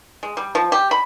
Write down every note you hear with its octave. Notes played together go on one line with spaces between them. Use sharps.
G#3
G3
F3
G4
B5